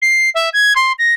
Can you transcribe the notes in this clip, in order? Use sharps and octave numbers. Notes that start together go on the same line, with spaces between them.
C7
E5
G#6
C6
A#6